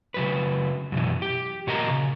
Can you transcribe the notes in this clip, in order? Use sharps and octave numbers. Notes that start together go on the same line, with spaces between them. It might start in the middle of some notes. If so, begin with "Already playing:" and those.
C#3 F#3 B4
F#2 B2 E3
G4
A#2 F#4 A#4 D#5 A#5
C#3